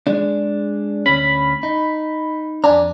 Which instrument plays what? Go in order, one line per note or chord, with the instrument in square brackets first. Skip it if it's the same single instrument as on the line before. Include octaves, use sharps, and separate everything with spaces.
[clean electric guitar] G#3 D4
[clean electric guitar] D2 C#4 [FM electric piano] B5
[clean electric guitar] D#4
[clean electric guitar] F2 G#5 A#5 [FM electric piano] D4